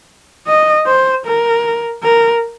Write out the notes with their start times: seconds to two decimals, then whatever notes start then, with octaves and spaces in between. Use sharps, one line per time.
0.47 D#5
0.87 C5
1.26 A#4
2.03 A#4